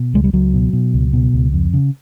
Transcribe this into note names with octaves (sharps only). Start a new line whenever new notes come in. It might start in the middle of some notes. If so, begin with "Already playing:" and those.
Already playing: B2
C#2 G#3
G3
C#2 F#3
B2
B2
C#2
B2
C#2
F2
C#3